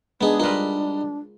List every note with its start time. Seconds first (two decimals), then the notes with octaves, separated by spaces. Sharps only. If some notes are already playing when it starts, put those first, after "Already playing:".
0.21 G#3 B3 D4 D#4 G#4
0.40 G3 D#4 F4 A#4 B4